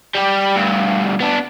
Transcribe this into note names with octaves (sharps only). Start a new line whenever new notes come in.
G3 G4
D2 G2
B3 D4